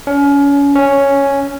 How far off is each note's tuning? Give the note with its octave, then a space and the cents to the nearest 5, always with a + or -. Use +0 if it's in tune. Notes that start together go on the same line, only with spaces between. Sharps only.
C#4 +30
C#4 +0